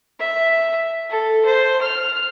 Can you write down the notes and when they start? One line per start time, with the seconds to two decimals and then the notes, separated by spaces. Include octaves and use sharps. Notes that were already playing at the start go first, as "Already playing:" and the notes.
0.20 E5
1.10 A4
1.46 C5
1.82 F6